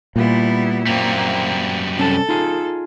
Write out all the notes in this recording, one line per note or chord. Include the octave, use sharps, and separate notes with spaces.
A#2 G3 B3 E4
F#2 G3 A#3 C4
C2 C#4 A4 A5
D#4 F4 G#4